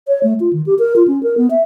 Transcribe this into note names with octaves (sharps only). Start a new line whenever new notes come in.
C#5
A3
F4
D#3
G4
A#4
F4
C#4
A#4
B3
E5